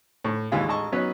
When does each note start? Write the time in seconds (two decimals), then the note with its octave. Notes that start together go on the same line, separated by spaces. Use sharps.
0.25 A2
0.52 G#1 D#2 E3 G#3 F4 G#4
0.68 A1 G#3 D#5 A5 C#6
0.92 F#3 B3 C#4 D#4 B4